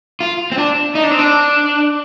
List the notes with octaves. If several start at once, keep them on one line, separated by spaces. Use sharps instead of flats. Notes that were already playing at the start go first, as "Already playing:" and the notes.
F4
C4
D4
D#4
D4
C4
D4